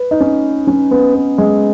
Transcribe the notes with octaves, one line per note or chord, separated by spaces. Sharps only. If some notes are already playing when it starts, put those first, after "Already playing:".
Already playing: B4
D#4
C#4
C#4
B3
B3
G#3